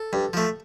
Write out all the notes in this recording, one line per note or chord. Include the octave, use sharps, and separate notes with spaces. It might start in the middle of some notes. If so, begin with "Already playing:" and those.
Already playing: A4
G2
F3 A3